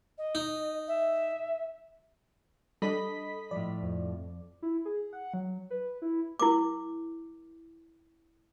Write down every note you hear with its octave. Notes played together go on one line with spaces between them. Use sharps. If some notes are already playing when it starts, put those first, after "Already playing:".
D#5
D#4
E5
G3 D4 A4 D#5 B5 B6
A2 F3 D5
F2
E4
G#4
F#5
F#3
B4
E4
E4 A#4 D6